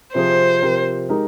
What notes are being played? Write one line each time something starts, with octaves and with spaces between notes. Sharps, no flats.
C3 F3 C4 F4 G#4 C5
C3 F3 C4 G4 A#4
G#3 D#4 G4 A#4